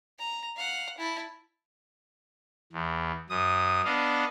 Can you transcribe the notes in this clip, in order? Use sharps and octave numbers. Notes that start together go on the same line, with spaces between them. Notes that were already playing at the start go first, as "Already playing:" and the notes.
A#5
F5 F#5
E4 A5
E2
F#2 D#6
B3 D4 D#5 F5